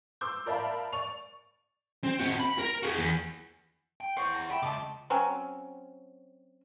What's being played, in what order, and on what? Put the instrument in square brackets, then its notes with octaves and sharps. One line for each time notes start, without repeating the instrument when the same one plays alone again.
[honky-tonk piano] C6 D6 E6 G6
A#4 D5 E5 F5 A5 B5
D5 C#6 F7
[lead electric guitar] C4
C4 F#4
B5
A#4
F#4 G#4
E2
G5
[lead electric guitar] E4 F#5 [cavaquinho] C5 C#5
[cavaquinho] A#5
[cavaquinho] E5 B5 [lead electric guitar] G5
[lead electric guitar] C#2 [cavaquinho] D#5 A5 D6
[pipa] F#3 C4 C#4